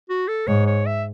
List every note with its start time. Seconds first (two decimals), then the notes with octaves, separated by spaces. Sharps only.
0.09 F#4
0.28 A4
0.47 G#2 C#5
0.67 C#5
0.86 E5